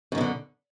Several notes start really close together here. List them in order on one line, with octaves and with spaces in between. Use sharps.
F#2 D#3 B2 D3